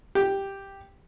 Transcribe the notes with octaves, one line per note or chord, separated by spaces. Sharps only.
G4